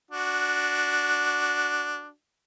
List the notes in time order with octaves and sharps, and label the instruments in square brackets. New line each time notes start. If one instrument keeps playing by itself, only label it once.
[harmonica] D4 F#4